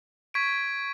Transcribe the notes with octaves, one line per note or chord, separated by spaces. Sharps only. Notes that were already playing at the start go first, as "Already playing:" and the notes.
C#6 G#6 B6 D7